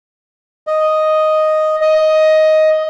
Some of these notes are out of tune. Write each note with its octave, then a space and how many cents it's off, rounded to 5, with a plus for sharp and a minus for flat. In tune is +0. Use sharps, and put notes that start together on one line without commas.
D#5 +0
D#5 +10